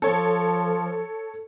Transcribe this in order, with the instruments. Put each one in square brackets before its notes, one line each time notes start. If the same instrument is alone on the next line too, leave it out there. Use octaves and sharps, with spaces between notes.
[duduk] F3 [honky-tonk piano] A4 C#5